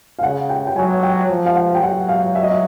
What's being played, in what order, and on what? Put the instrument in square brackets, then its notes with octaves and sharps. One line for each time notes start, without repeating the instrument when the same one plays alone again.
[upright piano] F5
[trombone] C#3 [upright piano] F#5
[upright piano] G5
G5
[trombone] F#3 [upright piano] G#5
[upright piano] G5
[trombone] F3
[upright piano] F5
F#5
G5
[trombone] F#3 [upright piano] F#5
[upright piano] F5
E5
D#5
E5